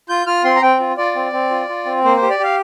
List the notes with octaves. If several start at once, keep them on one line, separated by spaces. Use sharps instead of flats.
F4 G6
F4 F6
C4 C6
A#5
C4 G5
F4
F4 D5
C4
C4
F4
F4
C4
A#3 C5
C5
G4
D5
G4 F5